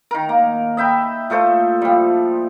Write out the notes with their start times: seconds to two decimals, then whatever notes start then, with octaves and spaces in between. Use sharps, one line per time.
0.11 D#3 A#4
0.29 A#3
0.77 D#5 E5 G5 B5
1.30 A#2 A3 A4 C5
1.82 F3 G3